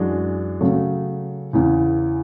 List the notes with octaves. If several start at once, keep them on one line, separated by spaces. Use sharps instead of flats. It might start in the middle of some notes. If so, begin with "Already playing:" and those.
Already playing: F#2 E3 G#3 D4 F#4
C#3 F#3 A3
E2 C#3 E3